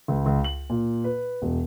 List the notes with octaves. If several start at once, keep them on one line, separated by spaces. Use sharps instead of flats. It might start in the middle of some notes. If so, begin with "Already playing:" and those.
C#2
C#2
F#7
A#2
B4
E1